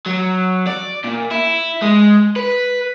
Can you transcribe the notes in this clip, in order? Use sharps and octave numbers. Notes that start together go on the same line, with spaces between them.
F#3
D5
A#2
E4
G#3
B4